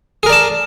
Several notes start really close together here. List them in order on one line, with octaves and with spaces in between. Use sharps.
G#4 A#4 D5 A5